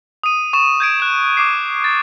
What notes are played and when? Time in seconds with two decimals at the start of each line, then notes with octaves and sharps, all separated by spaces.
0.23 D#6 D#7
0.53 C#6 E7
0.80 G6 G#6 D7
1.00 F#6 E7
1.37 D6 C7
1.84 A6